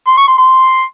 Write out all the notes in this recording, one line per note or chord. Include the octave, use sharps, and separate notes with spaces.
C6
C#6
C6
C6